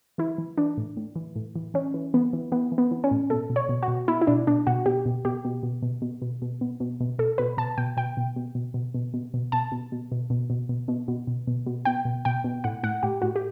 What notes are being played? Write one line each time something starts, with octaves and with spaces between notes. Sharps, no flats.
E3 E4
E3
E3 D4
A2
A2
E3
A2
E3
E3 C#4
E3
E3 B3
E3
E3 B3
E3
B3
E3
C#4
A2
B2 A4
B2
C#5
B2
F#4
B2
B2 E4
E4
B2 D4
B2 D4
B2 F#4
B2 G4
B2
B2 G4
B2
B2
B2
B2
B2
B2
B2
B2
B2
B2 A4
B2 B4
B2 A5
B2 G5
B2 G5
B2
B2
B2
B2
B2
B2
B2
B2 A5
B2
B2
B2
B2
B2
B2
B2
B2
B2
B2
B2
B2 G5
B2
B2 G5
B2
A2 F#5
A2 F#5
A2 G4
A2 F#4
G4